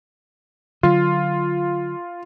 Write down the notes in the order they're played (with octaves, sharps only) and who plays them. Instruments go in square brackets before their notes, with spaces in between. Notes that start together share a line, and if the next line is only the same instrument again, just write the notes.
[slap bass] D3 F#3 [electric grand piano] F4